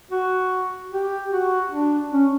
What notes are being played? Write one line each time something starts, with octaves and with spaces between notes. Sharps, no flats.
F#4
G4
F#4
D4
C#4